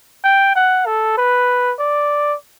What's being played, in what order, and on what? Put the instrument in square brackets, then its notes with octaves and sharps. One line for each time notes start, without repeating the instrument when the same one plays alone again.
[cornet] G5
F#5
A4
B4
D5